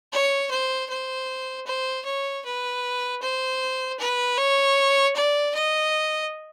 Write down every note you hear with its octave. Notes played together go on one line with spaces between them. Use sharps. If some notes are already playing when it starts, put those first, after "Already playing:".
C#5
C5
C5
C5
C#5
B4
C5
B4
C#5
D5
D#5